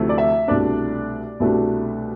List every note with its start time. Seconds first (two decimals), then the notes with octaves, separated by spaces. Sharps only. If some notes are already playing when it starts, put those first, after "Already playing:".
Already playing: D2 C3 F3 A3 E4
0.09 D5
0.18 E5
0.48 C2 B2 A3 D4 D5
1.40 C2 B2 A3 D4